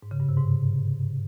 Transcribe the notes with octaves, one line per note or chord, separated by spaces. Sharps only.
G#2
C#3
G2
C3
G#2